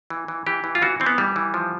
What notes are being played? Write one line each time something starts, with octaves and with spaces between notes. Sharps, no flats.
E3
E3
E3 G4
E3
F4
E3 F#4
E3 C4
B3
E3 G3
E3
F3